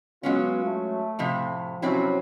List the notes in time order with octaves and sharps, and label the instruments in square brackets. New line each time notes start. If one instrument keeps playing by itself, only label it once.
[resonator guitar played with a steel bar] F#3 G#3 C#4 [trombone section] B3 F4
[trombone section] A3
[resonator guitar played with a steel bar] A2 C3 F3
[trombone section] C3 F3 C#4 [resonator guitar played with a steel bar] F#3 C4 E4